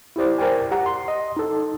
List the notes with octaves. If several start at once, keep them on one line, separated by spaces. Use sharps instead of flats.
E4 G4 C5 D5
A#4 C5 D5 G5 G#5
G4 F#5 A#5
C6
D#5
D#4 A4